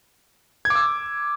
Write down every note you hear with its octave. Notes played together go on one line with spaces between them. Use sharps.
G#6
D6
E6